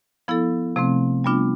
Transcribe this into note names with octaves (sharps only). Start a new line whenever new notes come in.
F3 B3 E4 A4
C3 F3 A3 C4
G3 B3 D4 F4